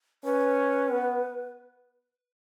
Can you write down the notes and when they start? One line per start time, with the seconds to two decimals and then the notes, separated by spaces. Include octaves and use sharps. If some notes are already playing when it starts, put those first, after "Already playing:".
0.24 C#4 B4
0.91 B3